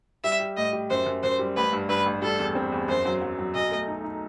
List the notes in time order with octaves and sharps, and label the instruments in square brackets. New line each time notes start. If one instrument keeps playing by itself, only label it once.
[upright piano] G3 [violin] E5
[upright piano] G4
[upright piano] A2 [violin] D#5
[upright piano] G4
[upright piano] F#2 [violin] C5
[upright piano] F#2
[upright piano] F#2 [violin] C5
[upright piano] G3
[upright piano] A1 [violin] B4
[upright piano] G2
[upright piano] G2 [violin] B4
[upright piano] A1
[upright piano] G3 [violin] A4
[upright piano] E2
C4
E2
[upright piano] F#2 [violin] C5
[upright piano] F#3
F#3
F#3
[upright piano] B1 [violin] D#5
[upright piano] A3
D#4
D#4